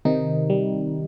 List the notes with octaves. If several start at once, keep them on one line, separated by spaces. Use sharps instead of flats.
C3 D#3 D#4
G3